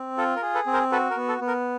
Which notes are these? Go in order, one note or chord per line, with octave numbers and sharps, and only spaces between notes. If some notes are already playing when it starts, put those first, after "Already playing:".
Already playing: C4
F4 A4
A#4
G#4
A4 B4
C4
A#4 C5
F#4 A4 B4
A#4
B3
A4
B3
A#4